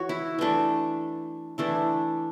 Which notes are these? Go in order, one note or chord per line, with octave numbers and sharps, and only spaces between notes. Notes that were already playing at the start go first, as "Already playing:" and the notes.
Already playing: E3 F#4 C#5
E4
E3 A3 D4
E3 A3 D4 E4